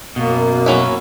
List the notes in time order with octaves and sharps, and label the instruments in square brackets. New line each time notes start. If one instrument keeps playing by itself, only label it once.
[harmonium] F#2 A#3 [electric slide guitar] B2
[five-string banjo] F#3 C#4 E4